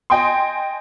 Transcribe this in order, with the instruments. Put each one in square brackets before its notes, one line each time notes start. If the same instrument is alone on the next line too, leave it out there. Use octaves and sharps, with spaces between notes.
[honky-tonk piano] D#5 G5 G#5 C6